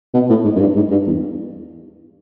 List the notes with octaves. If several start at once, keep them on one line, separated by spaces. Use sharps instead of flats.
B2
A2
G#2
F#2
G2
G#2
G2
E2